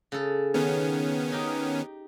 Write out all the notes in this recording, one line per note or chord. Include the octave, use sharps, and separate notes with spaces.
C#3 A4
D#3 B3 C#4
D#4 G4